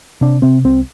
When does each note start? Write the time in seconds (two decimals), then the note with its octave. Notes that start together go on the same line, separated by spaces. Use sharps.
0.21 C3 D4
0.42 C3 C4
0.64 C2 C4